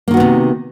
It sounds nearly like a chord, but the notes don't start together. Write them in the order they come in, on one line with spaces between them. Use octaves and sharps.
A#3 D#3 F#4 B3 C3